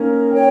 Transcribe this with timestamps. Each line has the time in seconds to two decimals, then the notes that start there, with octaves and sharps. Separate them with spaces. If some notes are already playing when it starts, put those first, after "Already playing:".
Already playing: A#3 C#4 D#4 A#4
0.31 C#5 G5